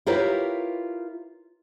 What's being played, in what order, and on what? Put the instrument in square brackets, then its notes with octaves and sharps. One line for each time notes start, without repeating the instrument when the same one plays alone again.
[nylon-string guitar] E4 F4 G4 A#4 B4 C#5